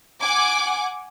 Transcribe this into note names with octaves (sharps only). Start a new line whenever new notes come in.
F#5 G#5 D6